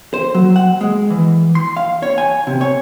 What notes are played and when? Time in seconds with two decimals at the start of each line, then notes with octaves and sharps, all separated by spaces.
0.14 C5
0.34 F#3
0.56 F#5
0.81 G#3
1.10 E3
1.55 C6
1.77 F5
2.03 C#5
2.18 G#5
2.47 C3
2.61 C#5